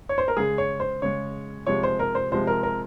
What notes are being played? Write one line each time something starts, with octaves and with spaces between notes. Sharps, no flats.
C#5
C5
A#4
C#3 G#3 G#4
C#5
C5
C#3 G#3 C#5
C3 F3 G#3 C#5
C5
A#4
C5
C3 F3 G#3 C5
A#4
A#4